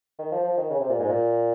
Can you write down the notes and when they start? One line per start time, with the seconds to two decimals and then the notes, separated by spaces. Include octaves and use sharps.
0.19 D#3
0.31 F3
0.44 F3
0.57 D#3
0.70 C#3
0.80 C3
0.89 A#2
0.99 G#2
1.09 A#2